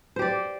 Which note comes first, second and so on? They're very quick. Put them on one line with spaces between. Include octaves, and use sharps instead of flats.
C5 G4 D5